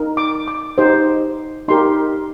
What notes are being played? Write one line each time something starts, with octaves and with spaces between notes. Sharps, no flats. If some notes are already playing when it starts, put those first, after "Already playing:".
Already playing: D#4 A#4
D6
D6
D#4 G4 C5
D#4 G4 A#4 C6